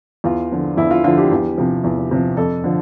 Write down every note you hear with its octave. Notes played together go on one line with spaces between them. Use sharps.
E2 F4
D3 F3
E2 E4
F4
D3 F3 F4
G4
E2
C3 F3
E2
C3 F3
F2 A4
D3 F3